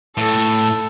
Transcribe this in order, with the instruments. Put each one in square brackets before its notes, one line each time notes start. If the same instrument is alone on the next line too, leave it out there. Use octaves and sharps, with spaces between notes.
[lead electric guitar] A2 [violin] A4